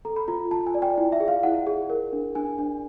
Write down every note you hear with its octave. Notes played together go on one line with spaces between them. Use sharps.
A4 A#5
B5
F4 A#5
F4 A5
G#5
D5
G5
E4
E5
G#4
F5
E4 F#5
G#4
A#4
D4
D4 G#5
D4